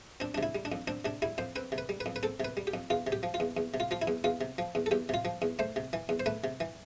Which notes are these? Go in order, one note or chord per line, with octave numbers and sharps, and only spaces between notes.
C4 D4
C3 D4
E4
G3
D4
F2
C4 D4
C3 D4
G3 E4
F2 C5
C4 B4
C3
B4
G3
B4
F2
B4
C4 A4
C3 B4
G3
G4
F2
E2 F4
C3
G4
F3
F4
E2
E2
C3
F4
F3 F4
E4
E2
E2 F4
C3
F3
E2
A4
E2 G4
C3 F4
F3
E2
A3 C5
C3
E3
E2
C5
A3 B4
C3
E3